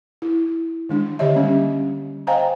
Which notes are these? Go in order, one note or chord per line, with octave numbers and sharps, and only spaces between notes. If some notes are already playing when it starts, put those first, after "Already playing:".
E4
D#3 G#3 D4
D3 D#3 G4 C#5 D#5 E5
G3 A#3 C#4
C5 D#5 F5 G5 G#5 A#5